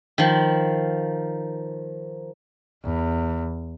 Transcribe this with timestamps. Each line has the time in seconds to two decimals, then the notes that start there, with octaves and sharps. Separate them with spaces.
0.18 D#3 F3
2.85 E2